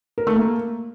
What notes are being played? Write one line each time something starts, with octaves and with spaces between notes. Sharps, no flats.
A#4
A3
A#3